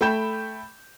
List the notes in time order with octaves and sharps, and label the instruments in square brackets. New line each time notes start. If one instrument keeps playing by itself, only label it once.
[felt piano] A3 G5 B5 G6 E7